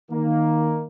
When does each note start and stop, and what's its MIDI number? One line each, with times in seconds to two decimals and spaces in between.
0.11 0.86 51
0.11 0.86 58